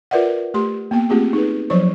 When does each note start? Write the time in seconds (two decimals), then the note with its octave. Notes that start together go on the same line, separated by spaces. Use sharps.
0.11 F4 A#4 B4 D5 E5 F#5
0.54 A3 G4 C6
0.91 A#3 B3 G5
1.10 A3 A#3 C4 F4 G4 G#4
1.33 D#4 G#4 B4
1.70 F3 F#3 C5 C#5 C#6